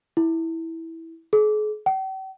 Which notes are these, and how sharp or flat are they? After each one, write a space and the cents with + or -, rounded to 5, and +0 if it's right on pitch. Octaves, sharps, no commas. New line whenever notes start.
E4 -10
G#4 +40
G5 -45